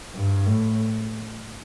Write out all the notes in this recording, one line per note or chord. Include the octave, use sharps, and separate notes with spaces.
G2
A2